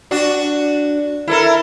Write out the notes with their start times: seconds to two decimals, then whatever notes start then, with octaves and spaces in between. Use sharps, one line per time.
0.11 D4 F#4
1.27 E4 A4 A#4